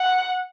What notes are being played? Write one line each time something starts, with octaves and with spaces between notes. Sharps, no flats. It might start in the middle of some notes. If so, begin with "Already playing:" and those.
Already playing: F#5